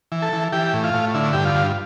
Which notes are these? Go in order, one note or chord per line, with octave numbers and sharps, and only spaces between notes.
E3
A4
E3
E3 G4
A2
F4
A2
D3 E4
G2 G4
F4
G2